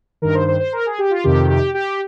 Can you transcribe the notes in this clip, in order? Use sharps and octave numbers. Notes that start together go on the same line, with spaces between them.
G2 D#3 A#4
C5
C5
C5
A#4
G#4
G4
F4
F2 C3 D#3 G4
G4
G4